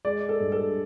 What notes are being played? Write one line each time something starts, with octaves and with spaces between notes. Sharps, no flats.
G#3 D5
A4
G2
A4